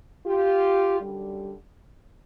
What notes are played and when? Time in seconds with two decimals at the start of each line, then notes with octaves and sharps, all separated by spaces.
0.26 F4 G4
1.01 F#2 D3 G3